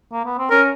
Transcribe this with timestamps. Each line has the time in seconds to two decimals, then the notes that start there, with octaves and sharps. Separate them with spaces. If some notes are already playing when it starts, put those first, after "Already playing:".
0.13 A#3
0.25 B3
0.38 C4
0.50 C#4 A#4